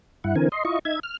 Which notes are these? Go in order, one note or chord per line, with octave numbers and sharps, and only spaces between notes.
G2 E4 F#5
D3 E3 C4 A#4 G#5
D#5 C6
E4 F4 D#5 C#6
D#4 E5 G#6
F6